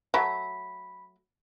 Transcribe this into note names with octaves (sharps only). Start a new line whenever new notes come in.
F#3 A3 B5 B6